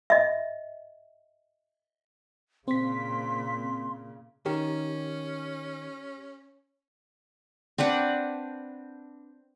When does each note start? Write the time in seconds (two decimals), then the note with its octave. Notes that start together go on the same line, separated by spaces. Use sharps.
0.10 D#5 E5
2.68 A#2 C#3 C4 C6 B6
4.46 D#3 C#4 G4
7.78 C4 D4 B4 F#5